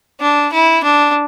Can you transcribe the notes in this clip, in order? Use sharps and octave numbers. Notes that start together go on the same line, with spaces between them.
D4
E4
D4